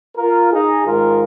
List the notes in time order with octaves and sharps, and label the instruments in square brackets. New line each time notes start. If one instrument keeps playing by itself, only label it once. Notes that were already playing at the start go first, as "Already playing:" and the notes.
[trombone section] F4 A#4
D#4 G#4
G#2 D#3 G#3 F4 A#4